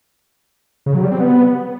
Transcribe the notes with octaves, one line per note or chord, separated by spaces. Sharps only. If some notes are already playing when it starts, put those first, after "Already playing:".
C#3
F#3
G3
C4
B3